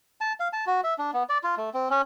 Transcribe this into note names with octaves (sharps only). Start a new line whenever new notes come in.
A5
F5
A5
F#4
E5
D4
B3
D5
F4
A3
C4
C#4